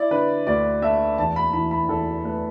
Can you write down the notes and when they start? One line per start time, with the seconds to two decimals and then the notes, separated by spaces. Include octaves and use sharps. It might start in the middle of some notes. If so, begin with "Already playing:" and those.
Already playing: E4 D5
0.11 D3 B4
0.47 D2 D5
0.82 A3 E5
1.18 E2 A5
1.36 B5
1.53 E3 B5
1.71 B5
1.89 E2 A4
2.25 A3 B4